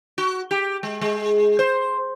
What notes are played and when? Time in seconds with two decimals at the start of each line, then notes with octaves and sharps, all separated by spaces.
0.18 F#4
0.51 G4
0.83 G#3
1.01 G#3
1.59 C5